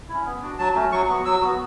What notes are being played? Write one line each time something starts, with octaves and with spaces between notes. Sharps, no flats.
C#4 E4
B3
D4 F#4
F#3 A5
A3 C#4 F#4
F#3 C#6
B3 F#4
F#3 E6
B3 F#4